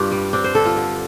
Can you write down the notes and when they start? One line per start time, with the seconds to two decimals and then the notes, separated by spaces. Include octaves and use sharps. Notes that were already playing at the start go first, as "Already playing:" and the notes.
Already playing: G2 C4 D4 F4 G4
0.11 G3
0.33 C4 D4
0.44 C5
0.55 D3 A4
0.65 F4
0.76 D3